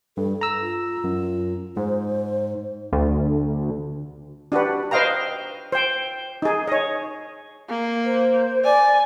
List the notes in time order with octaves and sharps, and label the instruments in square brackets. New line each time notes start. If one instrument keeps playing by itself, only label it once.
[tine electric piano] G2 [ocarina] A4
[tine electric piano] A#5 E6
[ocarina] F4
[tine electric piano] F#2
[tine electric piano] G#2 [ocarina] C5
[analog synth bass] D2
[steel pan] D4 F#4 G4 B4
B4 C5 D#5 F5 G5 A#5
C5 G5
D#4 G#4
C#5 D#5
[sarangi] A#3
[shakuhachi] C5
[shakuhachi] D5 [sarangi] G#5